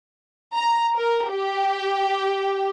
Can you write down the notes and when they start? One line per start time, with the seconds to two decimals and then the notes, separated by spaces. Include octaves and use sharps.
0.55 A#5
0.97 A#4
1.31 G4